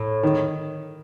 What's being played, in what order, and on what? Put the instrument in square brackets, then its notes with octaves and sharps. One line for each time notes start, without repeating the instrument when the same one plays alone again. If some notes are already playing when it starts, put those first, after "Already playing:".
Already playing: [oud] A2
[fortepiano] D#3